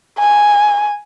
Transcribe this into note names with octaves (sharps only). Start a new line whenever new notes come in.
G#5